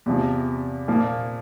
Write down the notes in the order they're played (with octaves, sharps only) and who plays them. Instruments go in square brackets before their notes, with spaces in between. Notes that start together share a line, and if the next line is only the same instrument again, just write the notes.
[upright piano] E2 C3 F3
A#2 F3 A#3